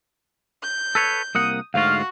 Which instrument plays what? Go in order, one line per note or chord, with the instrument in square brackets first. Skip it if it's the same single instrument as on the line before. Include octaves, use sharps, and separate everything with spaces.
[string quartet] G6
[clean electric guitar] A4 B4 C#5
[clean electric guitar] C2 A#3 F#5 [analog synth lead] D#6
[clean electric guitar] D2 G#2 F4 [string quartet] F#4 [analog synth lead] F5